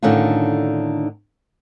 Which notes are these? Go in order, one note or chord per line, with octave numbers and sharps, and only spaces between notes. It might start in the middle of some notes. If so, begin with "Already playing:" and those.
A2 D3 D#3 C#4 D4 F4